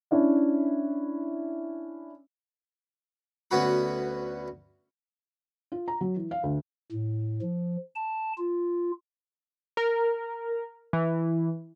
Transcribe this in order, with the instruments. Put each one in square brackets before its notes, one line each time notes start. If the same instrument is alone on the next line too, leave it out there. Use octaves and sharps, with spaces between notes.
[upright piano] C#4 D4 E4 D5
[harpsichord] D2 B3 C#4 F#4 B5
[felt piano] F4
A#5
F#3
E3
F5
D2
[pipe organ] A2
F3
A5
F4
[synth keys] A#4
E3